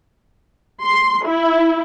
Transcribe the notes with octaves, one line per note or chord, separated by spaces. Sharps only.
C6
E4